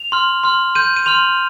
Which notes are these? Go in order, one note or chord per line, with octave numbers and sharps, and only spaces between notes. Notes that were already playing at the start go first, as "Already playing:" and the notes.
Already playing: F7
C6 F6
C6 F6
C6 G6 D#7
D#7
C6 F6 F7